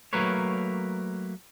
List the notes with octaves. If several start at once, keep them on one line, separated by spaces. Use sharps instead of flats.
F#3 A3 A#3 A#4 B4 C#5